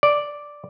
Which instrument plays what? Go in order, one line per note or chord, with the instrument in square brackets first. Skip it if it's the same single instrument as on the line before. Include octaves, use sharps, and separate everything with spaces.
[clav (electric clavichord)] D5